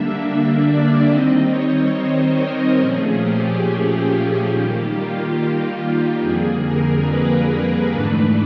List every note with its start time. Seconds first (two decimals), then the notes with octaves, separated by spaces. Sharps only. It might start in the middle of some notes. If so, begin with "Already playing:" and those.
Already playing: D3 G3 A#3 D4 E5
0.65 D5
1.08 D#3 G3 C4 D#4 D#5
1.51 C#5
1.94 C5
2.37 A#4
2.79 A#2 F3 A3 C#4 G#4
3.21 G4
4.50 D#3 G3 A#3 G4
4.93 F4
6.21 F2 D3 G3 A#3 G#4
6.64 A#4
7.07 B4
7.92 G#2 E3 A3 D4